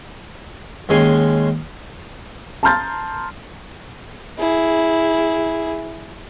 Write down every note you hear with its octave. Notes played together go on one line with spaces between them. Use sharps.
D#2 G#3 C#4 G#5 C6
A5 A#5 C6 F6 G6 A6
E4 G#4